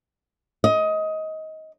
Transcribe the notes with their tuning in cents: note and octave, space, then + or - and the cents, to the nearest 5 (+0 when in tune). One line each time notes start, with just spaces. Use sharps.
D#5 +20